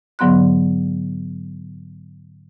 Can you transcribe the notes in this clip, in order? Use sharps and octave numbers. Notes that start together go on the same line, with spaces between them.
G#2 D3 F#3 B3 C6 F#6